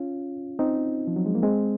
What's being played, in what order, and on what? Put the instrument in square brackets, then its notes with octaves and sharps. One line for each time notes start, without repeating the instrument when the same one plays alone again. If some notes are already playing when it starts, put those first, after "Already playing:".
Already playing: [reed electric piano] C#4 F4
C4 D#4
F3
F#3
G#3
A#3
G#3 C4